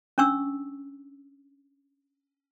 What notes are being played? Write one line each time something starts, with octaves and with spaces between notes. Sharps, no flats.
C#4 D4 C#6 E6